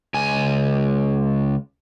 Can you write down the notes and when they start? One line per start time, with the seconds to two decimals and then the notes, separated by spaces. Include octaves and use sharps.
0.14 C#2 G#5